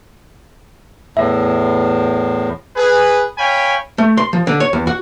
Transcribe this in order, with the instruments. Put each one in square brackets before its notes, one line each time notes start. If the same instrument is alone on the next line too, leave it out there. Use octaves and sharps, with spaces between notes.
[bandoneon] E2 A2 [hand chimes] E5
[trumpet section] G#4 B4
C#5 F5 G5 G#5 B5
[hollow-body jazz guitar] A3
C6
F3
D3
C#5
E2
F#4